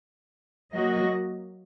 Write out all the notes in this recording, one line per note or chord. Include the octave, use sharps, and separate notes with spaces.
F#3 A#3 F#4 D#5